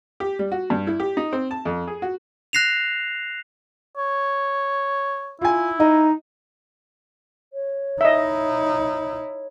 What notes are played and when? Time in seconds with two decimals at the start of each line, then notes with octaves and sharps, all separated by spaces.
0.20 G4
0.39 G3
0.52 F#4
0.70 G2
0.87 E4
1.00 G4
1.17 D#4
1.33 C4
1.51 A5
1.65 F2
1.87 G#4
2.02 F#4
2.53 F#6 A#6 C7 E7 F7
3.97 C#5
5.41 E4 F4 G#5
5.80 D#4 D#5
7.53 C#5
8.01 D#4 E4 D#5 E5